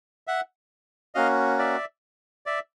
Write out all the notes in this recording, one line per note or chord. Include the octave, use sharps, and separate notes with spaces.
E5 F#5
A#3 C#4 F#4 D#5 F5
D5 E5
D5 E5